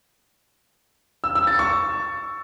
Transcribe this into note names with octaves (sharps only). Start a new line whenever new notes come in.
E6
E6
A6
C#6